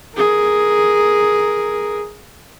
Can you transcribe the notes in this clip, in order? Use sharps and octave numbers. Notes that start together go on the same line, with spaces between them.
G#4 A#4